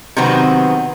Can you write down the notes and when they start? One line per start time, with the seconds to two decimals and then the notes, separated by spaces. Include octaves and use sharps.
0.17 C3 D#3 F#3 B3 C4